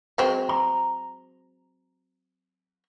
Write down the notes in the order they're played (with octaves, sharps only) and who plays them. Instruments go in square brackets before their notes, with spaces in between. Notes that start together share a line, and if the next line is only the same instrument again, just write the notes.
[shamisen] F#3 G#3 C4
[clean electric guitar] A#5